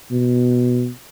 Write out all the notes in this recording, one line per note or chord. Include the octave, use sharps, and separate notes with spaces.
B2